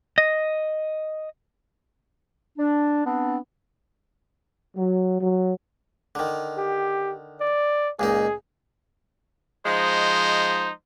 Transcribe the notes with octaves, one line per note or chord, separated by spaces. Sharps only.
D#5
D4
B3 C4 D4
F#3
F#3
D3 D#3
G4
D5
C#2 A#2 D#4 G#4
F3 G#3 D#4 C5